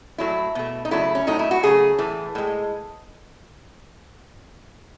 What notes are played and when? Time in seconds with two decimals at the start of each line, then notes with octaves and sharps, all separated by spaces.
0.18 A2 F#3 A3 E4
0.55 B2 A3
0.85 D#4
0.91 C#3 F#3 A3 E4
1.15 C#4
1.27 A2 F#3 A3 D#4
1.39 E4
1.51 F#4
1.63 C#3 F#3 A3 G#4
1.98 A2 E3 A3
2.35 A2 G#3